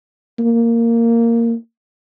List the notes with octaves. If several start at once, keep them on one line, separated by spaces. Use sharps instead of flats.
A#3